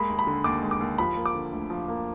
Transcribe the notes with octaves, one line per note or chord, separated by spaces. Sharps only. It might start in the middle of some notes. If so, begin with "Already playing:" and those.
Already playing: G#3 A#3 B5
D#2
B5
D3
D#2 D6
G#3
D6
D#2
F3 B5
A#3
D6
D3
D2
F3
A#3